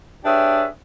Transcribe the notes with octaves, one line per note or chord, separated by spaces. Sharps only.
D4 G4 G#4 B4 C#5 E5